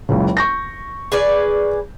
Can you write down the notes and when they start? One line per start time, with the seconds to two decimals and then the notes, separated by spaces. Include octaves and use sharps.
0.09 F#1 C#2 C#3
0.37 C#6 G6 A#6
1.12 G#4 B4 D5